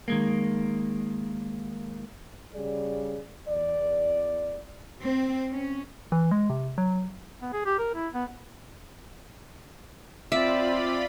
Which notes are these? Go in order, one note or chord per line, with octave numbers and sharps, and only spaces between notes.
D#3 G#3 A#3
C#3 G3 G#4 D5
E2 D5
C4
C#4
E3
G#3
C3
F#3
B3
G#4
G4
A#4
E4
B3
C4 F4 D5 E5 B5